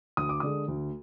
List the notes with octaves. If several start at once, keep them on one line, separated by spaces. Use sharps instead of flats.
D2 D#6
D6
D3 G#3 D#6
D2